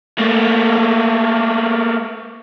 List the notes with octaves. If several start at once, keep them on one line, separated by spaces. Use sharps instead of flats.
A3 A#3